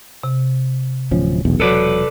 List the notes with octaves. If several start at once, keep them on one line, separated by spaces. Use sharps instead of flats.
C3
D1 F3 C#4
E1 B1 E2
E1 F#3 A4 B4 D5